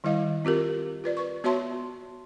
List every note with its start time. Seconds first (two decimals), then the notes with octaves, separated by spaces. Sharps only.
0.04 D#3 G3 E4 D#5 F5
0.45 C4 F4 G4 A#4
1.04 F4 B4 D5
1.17 B4 C#6
1.44 B3 F#4 C#5 E5 A5 C6